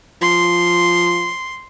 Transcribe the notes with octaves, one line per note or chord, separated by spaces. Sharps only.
F3 C6